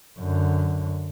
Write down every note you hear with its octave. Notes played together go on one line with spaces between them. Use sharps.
F#2 D3